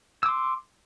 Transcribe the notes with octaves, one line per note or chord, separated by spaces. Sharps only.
C6 D6 E6